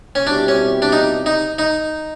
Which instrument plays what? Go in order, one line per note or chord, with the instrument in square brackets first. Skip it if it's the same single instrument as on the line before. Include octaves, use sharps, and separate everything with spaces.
[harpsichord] C#4
[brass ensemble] B2 G3 C4 E4 G4 [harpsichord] D4
[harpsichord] C#4
D4
D#4
D#4
D#4